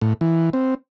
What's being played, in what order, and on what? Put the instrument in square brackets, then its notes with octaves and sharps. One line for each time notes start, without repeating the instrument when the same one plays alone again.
[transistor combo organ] A2
E3
C4